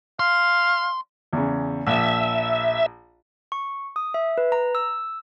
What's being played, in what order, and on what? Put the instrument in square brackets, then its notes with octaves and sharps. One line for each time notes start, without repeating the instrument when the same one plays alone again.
[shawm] F5 [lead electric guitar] C6
[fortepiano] E2 C#3
[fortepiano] A#1 [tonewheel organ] E5
[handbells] C#6
D#6
E5
B4
A#5
E6